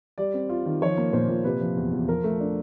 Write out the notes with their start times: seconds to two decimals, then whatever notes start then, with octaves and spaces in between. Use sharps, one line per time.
0.18 G3 D5
0.34 C4
0.49 F4
0.66 D#3
0.82 F3 C#5
0.97 A#3
1.13 A#2 C5
1.29 A#2
1.44 C3 B4
1.61 F3
1.76 E2
1.92 E2
2.08 F3 A#4
2.24 A3
2.40 D4